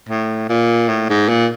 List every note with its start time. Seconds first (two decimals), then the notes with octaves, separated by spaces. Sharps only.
0.09 A2
0.49 A#2
0.89 A2
1.09 G#2
1.28 A#2